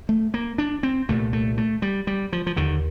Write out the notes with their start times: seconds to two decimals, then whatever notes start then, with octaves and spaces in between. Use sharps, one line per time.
0.09 A3
0.34 A#3
0.58 D4
0.83 C4
1.08 C2 A#2 A3
1.33 A3
1.58 A3
1.82 G3
2.07 G3
2.33 F3
2.47 F3
2.56 D#2 D3 D#3